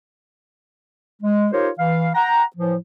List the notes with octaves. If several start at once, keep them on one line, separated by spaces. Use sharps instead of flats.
G#3
D#4 F4 G4 A#4 C5 C#5
E3 F5
F#5 G5 A#5
A2 E3 F3